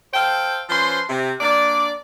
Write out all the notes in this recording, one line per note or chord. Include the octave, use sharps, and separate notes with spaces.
A4 C5 F5 G5
F3 C#4 B4 C5 C6
C3
A#3 D4 D5